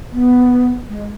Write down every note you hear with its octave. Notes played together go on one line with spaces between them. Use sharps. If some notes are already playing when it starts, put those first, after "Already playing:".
B3
G#3